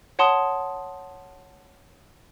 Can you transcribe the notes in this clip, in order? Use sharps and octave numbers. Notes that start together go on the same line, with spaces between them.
C#5 F#5 A5 C6 D#6